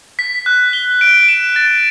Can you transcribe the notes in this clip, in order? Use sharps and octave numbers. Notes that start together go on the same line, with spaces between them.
B6
F#6
G7
D7
E7
A6